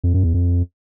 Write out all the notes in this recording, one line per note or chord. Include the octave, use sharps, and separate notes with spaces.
F2
F#2
E2
F2